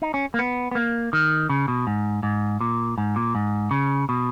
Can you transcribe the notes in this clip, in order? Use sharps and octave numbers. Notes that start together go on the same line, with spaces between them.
D#4
C#4
A#3
B3
B3
A#3
D#3
C#3
B2
G#2
G#2
A#2
G#2
A#2
G#2
C#3
B2